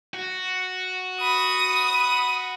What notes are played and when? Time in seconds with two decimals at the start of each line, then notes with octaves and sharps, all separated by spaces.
0.14 F#4
1.20 B5 D#6